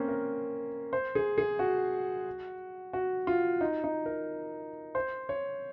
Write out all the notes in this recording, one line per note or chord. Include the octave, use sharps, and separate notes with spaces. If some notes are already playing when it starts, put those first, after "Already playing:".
Already playing: A#3 C4 C#4
A#4
C5
G#4
G#4
F#4
F#4
F4
D#4
D#4
A#4
C5
C#5